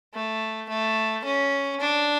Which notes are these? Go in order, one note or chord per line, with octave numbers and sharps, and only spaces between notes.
A3
A3
C#4
D4